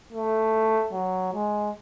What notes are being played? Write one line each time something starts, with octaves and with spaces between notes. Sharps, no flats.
A3
F#3
G#3